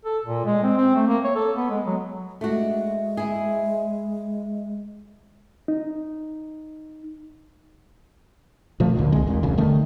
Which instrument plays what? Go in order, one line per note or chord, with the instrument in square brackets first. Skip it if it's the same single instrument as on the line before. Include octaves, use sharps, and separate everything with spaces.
[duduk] A4
A#2
G#3
C4
C4
A3
A#3
C#5
A4
B3
G#3
F#3
[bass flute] G#3 [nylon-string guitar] A3 D4 F#4
[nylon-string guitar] E4 G#4
[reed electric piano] D#4
[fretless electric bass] A#2 F3 A3
A1 D2 A#2 D3
F1 C2 G#3
A#1 D#2 A#2
E1 B1 F#2 C#3
D3 D#3 G3 A3